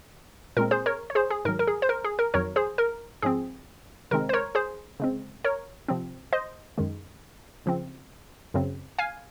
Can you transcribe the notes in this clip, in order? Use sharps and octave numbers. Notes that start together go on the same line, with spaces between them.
A#2 G#3 C4 A#4
G#4 C5
A#4 C#5
C#5
G#4 C5
G#4
G#2 D#3 F#3 A#4
A#4
G#4
C5
A#4
G#4
A#4
F2 D#3 F#3 A#4 C#5
G#4 C5
A#4
G#2 F3 C4 G#4
C3 D#3 G#3 C4 A#4
C5
A#4 C#5
G#4 C5
C#3 G#3 C4
A#4 C#5
C3 F3 C4
C5 D#5
F#2 D#3 G#3
C#3 F3 C4
F#2 C#3 F#3 C4
F5 G#5